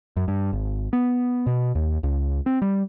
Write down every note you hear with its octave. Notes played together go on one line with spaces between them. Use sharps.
F#2
G2
G#1
B3
B2
D#2
C#2
C4
G3